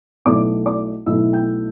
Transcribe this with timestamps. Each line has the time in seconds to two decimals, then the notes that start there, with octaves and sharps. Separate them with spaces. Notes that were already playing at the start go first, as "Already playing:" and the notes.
0.25 B1 B2 A3 E4 D5 D6
0.66 D5 D6
1.06 B1 B2 A3 E4 E5 E6
1.33 G5 G6